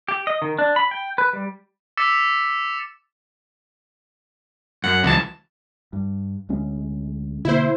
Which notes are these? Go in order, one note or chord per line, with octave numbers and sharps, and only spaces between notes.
G4
D#5
D#3
D4
B5
G5
B4
G3
D6 E6 A6 B6 C#7 E7
F#2 F#5
C#2 E3 F#3 A5
G2
D2 G#3 C#4
B2 D3 A#3 E4 C5